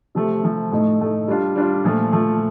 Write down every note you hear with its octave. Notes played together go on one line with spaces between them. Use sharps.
C3 F3 A3
C3 F3 A3
A2 A3 D#4
A2 A3 D#4
G3 D4 F4
G3 D4 F4
A#2 F3 A3
A#2 F3 A3